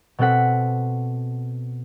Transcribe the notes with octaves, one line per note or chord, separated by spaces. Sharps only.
B2 C4 A4 F#5 B6